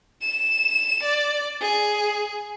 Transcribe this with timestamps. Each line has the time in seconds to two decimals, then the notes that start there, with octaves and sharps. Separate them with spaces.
0.22 E7
1.03 D5
1.61 G#4